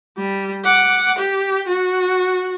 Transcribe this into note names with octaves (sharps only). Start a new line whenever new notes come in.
G3
F#5 D6
G4
F#4